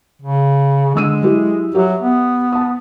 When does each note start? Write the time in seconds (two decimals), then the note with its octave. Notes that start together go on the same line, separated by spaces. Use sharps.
0.22 C#3
0.95 D3 G#3 E6 D#7
1.22 F#3 E4 G4
1.75 F#3 G4 E5
2.01 B3
2.52 A5 D#6